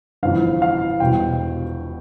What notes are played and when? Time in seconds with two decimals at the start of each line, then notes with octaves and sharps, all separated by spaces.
0.23 G1 F2 E3 F5
0.62 F5
1.00 E1 E2 B2 G3 G5